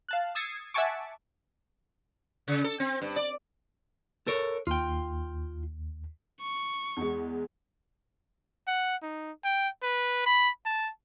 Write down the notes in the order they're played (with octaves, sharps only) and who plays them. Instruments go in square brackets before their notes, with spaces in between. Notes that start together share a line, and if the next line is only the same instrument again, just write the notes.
[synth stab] F5 A5 F#6
D#6 E6 G#6 A6 C7 C#7
E5 F#5 G#5 A5 C#6 D6
[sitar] C#3
A4
C4
G2
D5
[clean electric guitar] A4 A#4 C#5
[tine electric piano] D#2 [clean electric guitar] F4 G5
[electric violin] C#6
[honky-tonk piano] E2 G#3
[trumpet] F#5
D#4
G5
B4
B5
A5